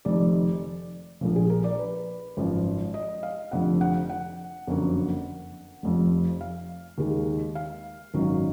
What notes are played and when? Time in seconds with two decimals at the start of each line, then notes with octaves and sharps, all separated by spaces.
0.05 F1 F2 D#3 D5
1.21 A#1 A#2 F3
1.36 G#4
1.50 A#4
1.64 D5
1.78 B4
2.37 G#1 F#2 F3
2.94 D#5
3.23 F5
3.52 F1 F2 D3 F3 F#5
3.81 F#5
4.10 F#5
4.67 F#1 F2 D3 F#3 A#3
5.83 F1 F2 F3
6.41 F5
6.98 D#2 D#3 G#3
7.55 F5
8.14 G#1 F#2 D#3 F#3